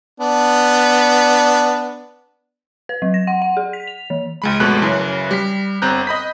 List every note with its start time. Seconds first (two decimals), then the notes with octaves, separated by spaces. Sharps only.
0.20 B3 D4
2.89 B4
3.02 F#3
3.14 A#6
3.27 F#5
3.42 F#5
3.57 G#4
3.73 B6
3.87 F7
4.10 E3
4.42 C#2 G#3 B5
4.60 G1 F2 B2 G#3 A3 F#6
4.82 F#2 C#3 E3
5.31 G3 B6
5.82 G1 C4 A#5 F#6 G6
6.07 D#5 B5 B6